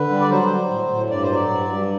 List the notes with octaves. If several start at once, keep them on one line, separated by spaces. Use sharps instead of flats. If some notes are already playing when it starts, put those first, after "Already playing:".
Already playing: D3 B4
G3
D5
F#3 C5
F#3
A2
A2
G2 D5
C5
F#3 D5
G2
G2